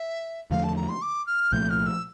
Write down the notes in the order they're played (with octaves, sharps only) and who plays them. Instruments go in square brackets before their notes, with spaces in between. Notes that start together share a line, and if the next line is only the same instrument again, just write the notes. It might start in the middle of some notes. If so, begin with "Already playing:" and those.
Already playing: [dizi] E5
[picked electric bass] E2 D3 F3 A3 [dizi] F5
[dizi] A5
A#5
C6
D6
F6
[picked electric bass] C2 A#2 F3 A3 [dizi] G6
[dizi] F6
E6